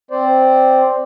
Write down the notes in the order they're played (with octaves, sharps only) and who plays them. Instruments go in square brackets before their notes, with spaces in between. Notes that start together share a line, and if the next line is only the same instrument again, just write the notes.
[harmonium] C4 C5 D5